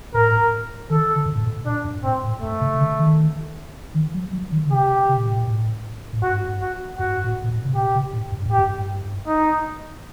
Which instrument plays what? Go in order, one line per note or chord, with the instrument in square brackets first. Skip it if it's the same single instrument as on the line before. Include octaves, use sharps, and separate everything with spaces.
[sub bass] A2 [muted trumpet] A#4
[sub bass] D#3 [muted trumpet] A4
[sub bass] D3
G2
A2
A#2
[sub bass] A#2 [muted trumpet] D4
[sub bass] G2
[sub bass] A2 [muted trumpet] C4
[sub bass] A2
[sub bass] G2 [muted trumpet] A3
[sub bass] C3
C3
D3
D#3
D#3
F#3
F#3
D#3
D3
[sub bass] C3 [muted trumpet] G4
[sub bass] C3
A#2
A2
A#2
A2
A2
[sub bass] G2 [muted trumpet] F#4
[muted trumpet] F#4
[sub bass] G2 [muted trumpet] F#4
[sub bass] A2
A#2
A2
C3
[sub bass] A#2 [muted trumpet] G4
[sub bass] C3
A2
G2
A2
[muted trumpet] G4
[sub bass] G2
[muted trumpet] D#4